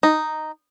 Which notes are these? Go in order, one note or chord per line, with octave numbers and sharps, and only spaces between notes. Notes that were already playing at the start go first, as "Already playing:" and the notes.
D#4